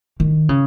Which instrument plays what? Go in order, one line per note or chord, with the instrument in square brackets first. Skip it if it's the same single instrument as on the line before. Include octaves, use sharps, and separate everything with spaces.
[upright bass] D#3
C#3